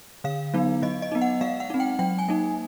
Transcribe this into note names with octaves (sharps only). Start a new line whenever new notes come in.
D3 F5
F#3 B3 D#4
F#3 D#5
D#5
B3 D#4
F#5
G#3 F5
F#5
C4 D#4
G5
F#3 G5
G#5
A#3 D#4